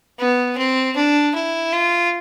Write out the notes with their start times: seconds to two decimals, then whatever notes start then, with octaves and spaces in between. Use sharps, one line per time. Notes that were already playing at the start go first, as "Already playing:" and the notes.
0.19 B3
0.58 C4
0.96 D4
1.35 E4
1.73 F4